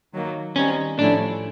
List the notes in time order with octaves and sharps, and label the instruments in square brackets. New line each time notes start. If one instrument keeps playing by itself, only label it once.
[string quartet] D#3 F#3 A#3
[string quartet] D#3 G3 C4 D#4 [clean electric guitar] C#4
[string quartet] A2 F3 A3 C#4 E4 [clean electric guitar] D4